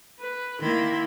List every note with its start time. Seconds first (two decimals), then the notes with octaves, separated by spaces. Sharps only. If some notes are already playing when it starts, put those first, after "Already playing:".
0.19 B4
0.61 D#3 A#3 E4 B5 C6